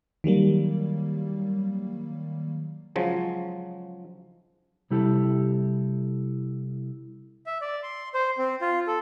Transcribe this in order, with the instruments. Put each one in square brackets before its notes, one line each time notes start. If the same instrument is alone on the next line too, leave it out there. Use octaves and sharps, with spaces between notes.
[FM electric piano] D#3 F#3 G3 A#3
[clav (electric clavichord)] C#3 F3 F#3 G#3
[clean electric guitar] C3 G3 E4 G4 A4
[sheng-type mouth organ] E5
D5
C6
C5
C4
F4
A4